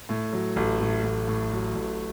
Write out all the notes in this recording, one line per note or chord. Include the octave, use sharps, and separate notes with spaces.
A2
F#3
A1
A2
A1
A2
F#3
A1